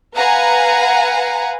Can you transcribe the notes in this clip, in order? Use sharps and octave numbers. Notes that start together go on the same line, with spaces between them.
B4 F5 F#5 G#5 A#5